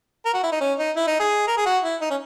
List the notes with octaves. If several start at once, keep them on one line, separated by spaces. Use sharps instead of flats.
A#4
F#4
E4
D#4
C#4
D#4
E4
D#4
G#4
A#4
G#4
F#4
E4
D#4
C#4